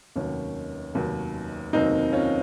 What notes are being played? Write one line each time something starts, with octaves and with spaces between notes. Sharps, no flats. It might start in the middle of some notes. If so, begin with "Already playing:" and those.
F1 D#2 D#3 F#3 C#4
F1 D#2 D#3 F#3
F1 D#2 D#3 F#3 C4 D#4
C#4 F4